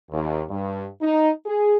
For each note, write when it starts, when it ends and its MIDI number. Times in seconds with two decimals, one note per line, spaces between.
0.11 0.42 39
0.49 0.85 43
1.01 1.29 63
1.45 1.78 68